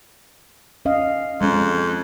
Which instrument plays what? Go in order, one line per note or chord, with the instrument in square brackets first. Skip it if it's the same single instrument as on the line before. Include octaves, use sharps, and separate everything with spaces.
[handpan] C#4 D#5 F5
[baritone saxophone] F2 [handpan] G#3 C#4